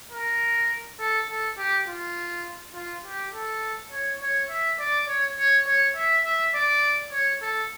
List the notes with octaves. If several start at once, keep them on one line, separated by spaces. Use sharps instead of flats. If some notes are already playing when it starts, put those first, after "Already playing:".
A#4
A4
A4
G4
F4
F4
G4
A4
C#5
C#5
E5
D5
C#5
C#5
C#5
E5
E5
D5
C#5
A4